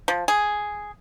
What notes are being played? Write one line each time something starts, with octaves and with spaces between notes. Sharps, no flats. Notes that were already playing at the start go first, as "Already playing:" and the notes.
F3
G#4